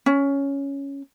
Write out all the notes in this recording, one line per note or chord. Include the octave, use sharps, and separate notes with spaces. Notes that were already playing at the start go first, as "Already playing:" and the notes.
C#4